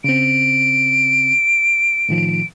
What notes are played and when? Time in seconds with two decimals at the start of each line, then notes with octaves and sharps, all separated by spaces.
0.04 C#3 C4 D7
2.09 A2 D#3 F3